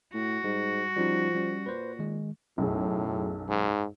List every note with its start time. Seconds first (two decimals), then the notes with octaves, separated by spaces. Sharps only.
0.14 A2 F#4
0.44 G#2 G3
0.96 F3 G3 C#4 D#4
1.35 G3 C#4
1.66 A#2 B4 C5
1.99 D#3 G#3
2.58 B1 F#2 A2 G#4
3.48 G#2